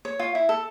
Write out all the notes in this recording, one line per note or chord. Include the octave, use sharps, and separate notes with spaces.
C#5
F4
E4
A4